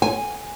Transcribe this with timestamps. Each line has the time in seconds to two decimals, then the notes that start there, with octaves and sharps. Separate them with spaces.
0.02 G#5